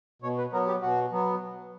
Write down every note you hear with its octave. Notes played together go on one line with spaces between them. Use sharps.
B2 C#5
B4
F#3 B3 A#4
G4
B2 F#4
F#3 B3